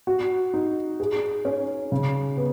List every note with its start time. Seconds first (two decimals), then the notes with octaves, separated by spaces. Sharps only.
0.07 F#4
0.54 D#4
1.00 G#4
1.45 C#4
1.92 C#3
2.37 B3